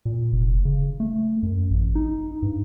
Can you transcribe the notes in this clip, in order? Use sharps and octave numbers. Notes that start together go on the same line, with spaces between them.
A#2
F1
C#3
A3
F#2
A1
D#4
G2